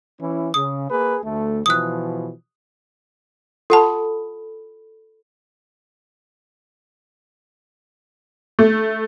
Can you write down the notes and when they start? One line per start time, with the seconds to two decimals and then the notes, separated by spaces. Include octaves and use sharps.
0.21 E3 C#4 E4
0.54 C#3 D#6
0.90 A#3 G#4 B4
1.24 D2 A3
1.66 B2 E3 F3 D#6 F#6
3.70 F4 A4 F#5 A5 B5
8.59 A3